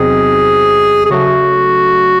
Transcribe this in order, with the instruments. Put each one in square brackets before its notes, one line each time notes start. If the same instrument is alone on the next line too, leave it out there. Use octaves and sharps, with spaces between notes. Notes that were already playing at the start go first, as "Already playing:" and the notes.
Already playing: [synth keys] E2 C3 F#3 C4 D#4 [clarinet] G#4
[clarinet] G#4
[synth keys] C#3 F#3 A3 [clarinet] F#4